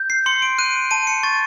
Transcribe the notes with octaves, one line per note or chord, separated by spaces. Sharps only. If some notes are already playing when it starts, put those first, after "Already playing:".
Already playing: G6
C7
C6 C#7
D7
F#6 D#7
A5 D#7
C#7
C#6 A6